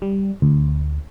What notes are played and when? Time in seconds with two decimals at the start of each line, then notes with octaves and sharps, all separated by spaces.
0.02 G3
0.42 D2